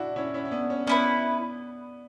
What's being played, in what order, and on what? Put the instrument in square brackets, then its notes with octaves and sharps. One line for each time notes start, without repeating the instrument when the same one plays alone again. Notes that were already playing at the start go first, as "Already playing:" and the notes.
Already playing: [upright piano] D4 E4 F#4
C#4 E4
C#4 E4
C#4
B3 D4
C#4
[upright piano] B3 D4 [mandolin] C#4 E4 B4